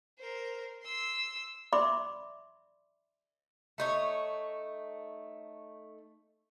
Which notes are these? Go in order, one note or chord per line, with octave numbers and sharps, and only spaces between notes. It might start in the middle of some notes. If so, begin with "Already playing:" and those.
A#4 C5
C6 E6
D5 E5 B5 C6 D6
A3 D#4 C#5